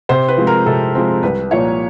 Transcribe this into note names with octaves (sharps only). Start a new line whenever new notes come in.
C3 C5
B4
F3 G#3 C4
A#4
C3 A4
F3 G#3 C4
C2 B4
A#2 F3 A#3 C#5